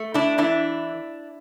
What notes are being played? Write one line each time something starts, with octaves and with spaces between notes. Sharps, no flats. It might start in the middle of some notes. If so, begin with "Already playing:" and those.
Already playing: A3
D4 E4
E3 D4 E4